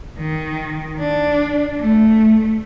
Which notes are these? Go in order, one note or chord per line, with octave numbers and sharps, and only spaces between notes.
D#3
D4
A3